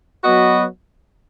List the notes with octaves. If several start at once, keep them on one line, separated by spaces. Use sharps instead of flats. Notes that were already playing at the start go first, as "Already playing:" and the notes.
F#3 B3 F#4 B4 D#5